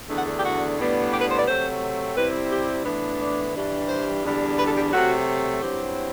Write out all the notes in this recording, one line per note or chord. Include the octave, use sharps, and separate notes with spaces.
E2 D3 A3 D4
F#5
A4
G4
F#4
A2 G3 B3 D4
G4
B4
C5
D5
C3 F#3 A3 C4 C5
C3 G3 C4 E4 B4
G4
A2 E3 B3 D4
D5
G2 E3 G3 D4
C5
E2 D3 G3 D4
B4
A4
G4
C3 F#3 A3 F#4
G2 F#3 C4 E4 G4